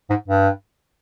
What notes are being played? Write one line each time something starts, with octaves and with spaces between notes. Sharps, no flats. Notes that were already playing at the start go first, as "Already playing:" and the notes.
G#2
G2